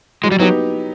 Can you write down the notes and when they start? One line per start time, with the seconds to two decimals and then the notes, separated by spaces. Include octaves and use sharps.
0.24 F#3 G#3
0.32 G3
0.40 F#3 B3 D#4 G4